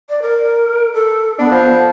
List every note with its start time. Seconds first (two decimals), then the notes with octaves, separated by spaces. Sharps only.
0.09 D5
0.22 A#4
0.94 A4
1.39 B3 D4
1.51 F3